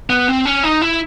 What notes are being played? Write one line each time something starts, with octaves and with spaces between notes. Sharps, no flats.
B3
C4
C#4
D#4
E4